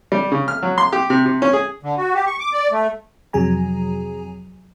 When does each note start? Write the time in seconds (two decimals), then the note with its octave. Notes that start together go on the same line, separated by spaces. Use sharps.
0.12 G3
0.32 C#3
0.48 F6
0.63 F#3
0.78 C6
0.93 G4
1.10 C3
1.26 C3
1.42 C#4
1.53 G#4
1.83 D3
1.97 F#4
2.14 G4
2.27 C#6
2.40 D6
2.53 D5
2.72 A3
3.33 F2 C3 F#3 G#4 G#5 A#5